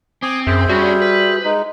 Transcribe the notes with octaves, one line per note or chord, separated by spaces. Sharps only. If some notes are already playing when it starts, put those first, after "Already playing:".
C4 G#5 D6 D#6
F#2 G#4 C5 E5
G3 C#4 D4 F#4
B4
G#3 D#4